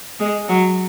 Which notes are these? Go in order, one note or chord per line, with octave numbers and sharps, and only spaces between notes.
G#3
F#3